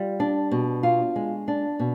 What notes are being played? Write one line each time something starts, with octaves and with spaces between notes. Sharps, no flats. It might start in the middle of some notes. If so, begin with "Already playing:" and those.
Already playing: G3 F4
D4
B2
F4
G#3
D4
B2